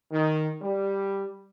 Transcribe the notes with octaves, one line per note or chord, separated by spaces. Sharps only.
D#3
G3